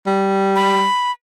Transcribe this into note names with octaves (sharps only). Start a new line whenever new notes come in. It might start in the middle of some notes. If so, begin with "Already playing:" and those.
G3
B5